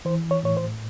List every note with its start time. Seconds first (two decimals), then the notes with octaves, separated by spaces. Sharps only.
0.05 E3 C5
0.31 C#5
0.43 A2 C#5
0.57 C5